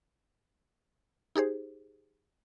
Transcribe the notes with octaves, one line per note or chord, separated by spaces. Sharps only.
D#4 G4 G#4 C5